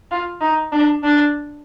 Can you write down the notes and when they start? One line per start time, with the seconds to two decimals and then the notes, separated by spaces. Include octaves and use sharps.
0.11 F4
0.41 D#4
0.72 D4
1.03 D4